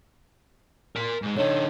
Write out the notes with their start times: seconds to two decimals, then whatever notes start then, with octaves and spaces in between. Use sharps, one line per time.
0.96 A#4 C6
1.22 G#2 G#3
1.37 D3 D#4 C#5